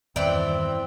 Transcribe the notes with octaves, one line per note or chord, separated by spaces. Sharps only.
E2 G2 D#3 E3 C4 D5 G5